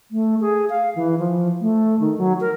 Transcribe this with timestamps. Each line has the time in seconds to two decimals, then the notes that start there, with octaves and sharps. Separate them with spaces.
0.11 A3
0.41 G#4
0.70 F5
0.96 E3
1.18 F3
1.61 A3
2.00 D#3
2.18 F#3
2.41 A#4